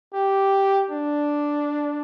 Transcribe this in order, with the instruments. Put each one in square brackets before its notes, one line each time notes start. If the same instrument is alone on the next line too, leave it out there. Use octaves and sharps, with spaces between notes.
[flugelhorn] G4
D4